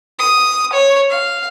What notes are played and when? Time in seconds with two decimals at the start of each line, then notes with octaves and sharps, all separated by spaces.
0.19 D#6
0.73 C#5
1.10 F5